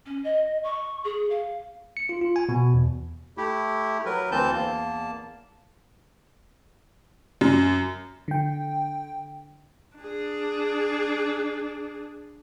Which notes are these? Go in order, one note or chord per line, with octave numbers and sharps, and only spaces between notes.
C#4
D#5
C#6
G#4
F5
C#7
F4
F4
G#5
B2
E2
A3 E4 G4
F#3 A#4 B4
D2 E3 C4 A5 G6
E2 A#3 A5
F#2
D3 G5
D4 G#4